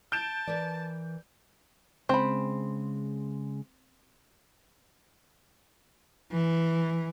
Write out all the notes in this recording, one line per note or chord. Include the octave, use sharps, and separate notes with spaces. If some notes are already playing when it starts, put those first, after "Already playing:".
A5 G6 D7 E7
E3 A#4 B4 D5
C#3 G#3 C4 B5
E3